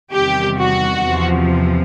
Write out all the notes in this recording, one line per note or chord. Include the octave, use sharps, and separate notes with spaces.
E2 C3 D#3 G3 G4
F#4
E2 C3 F3